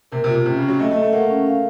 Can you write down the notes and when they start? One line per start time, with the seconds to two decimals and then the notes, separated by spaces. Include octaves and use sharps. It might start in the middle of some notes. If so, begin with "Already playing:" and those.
0.12 C3 A#4
0.24 C3
0.29 F4
0.35 C3
0.46 C3 C#4
0.57 C#3
0.62 C#4
0.68 F#3
0.79 A3 D#5
0.91 A3
0.96 A4
1.02 A3
1.13 A#3 F#5
1.30 C#4
1.47 F5